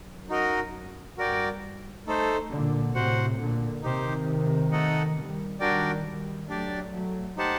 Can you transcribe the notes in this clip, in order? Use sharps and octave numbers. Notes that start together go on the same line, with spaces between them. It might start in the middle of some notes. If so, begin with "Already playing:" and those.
Already playing: F#2
D#4 F#4 A#4 D#5
G2 F#4 A#4 D5 G5
A3 D#4 A4 C5
A#2 D3
A2 C3 F#4 C5 F#5
A#2 D3
C3 D#3 D#4 G4 C5
A3 D#4 A4 D#5 F#5
D#3 G3
D#3 G3 D4 F#4 A#4 D5 G5
D#3 G3
F#3 A3 D4 G4 D5
F#3 A3
D#4 G4 C5 F#5 A5